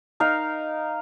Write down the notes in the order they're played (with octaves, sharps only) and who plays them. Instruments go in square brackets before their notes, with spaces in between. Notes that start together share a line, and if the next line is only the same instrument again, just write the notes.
[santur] D#4 A#4 F5